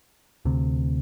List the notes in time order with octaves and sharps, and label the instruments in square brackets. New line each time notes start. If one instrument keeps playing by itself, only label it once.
[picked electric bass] D2 C3